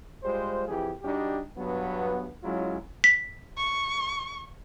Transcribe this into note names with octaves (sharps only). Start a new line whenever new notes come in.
G3 G#3 F4 C5
F2 E3 G4 G#4
G3 D4 D#4 F#4 G4
G2 F#3 B3
F#3 G#3 C#4 E4 F4
B6
C#6